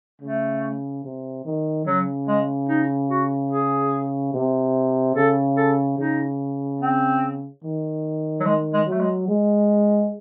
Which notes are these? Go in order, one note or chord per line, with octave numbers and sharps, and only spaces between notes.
C#3 A3
C3
D#3
C#3 F#3
G#3
D#4
F#4
G#4
C3
C#3 A4
A4
C#3 D#4
C4
D#3
F#3
D#3 G#3
G#3
F#3 A3
G#3
G#3